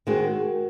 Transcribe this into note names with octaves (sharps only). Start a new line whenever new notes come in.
D#3 G#3 C4 F#4